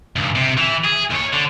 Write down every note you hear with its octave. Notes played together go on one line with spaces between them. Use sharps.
C#2 G2
C3
E3
G#4
D#2 C#5
D3